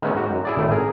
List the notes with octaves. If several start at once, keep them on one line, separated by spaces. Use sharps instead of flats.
D#3 G#3 A3 B3 C#4
G#2 F#4 G4
F#2
E4 G#4 D5
G#1 A2 A3 C5
G#4 A#4 G#5